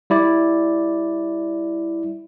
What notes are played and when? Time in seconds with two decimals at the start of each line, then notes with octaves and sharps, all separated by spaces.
0.10 G3 E4 D5